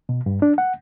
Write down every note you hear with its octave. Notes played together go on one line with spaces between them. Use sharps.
B2
G2
D4
F#5